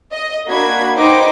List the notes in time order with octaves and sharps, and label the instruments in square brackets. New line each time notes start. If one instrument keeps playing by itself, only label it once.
[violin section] D#5
A#3 D4 F#4 B5 G#6
D#4 B4 C5 D#5 G5 D6